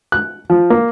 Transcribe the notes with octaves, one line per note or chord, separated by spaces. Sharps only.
F#6
F3
A#3